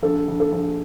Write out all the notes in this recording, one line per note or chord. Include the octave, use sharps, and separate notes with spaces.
A#1 A4
A#1
A4
A#1